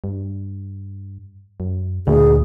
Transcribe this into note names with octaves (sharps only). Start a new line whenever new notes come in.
G2
F#2
D2 A#2 G#4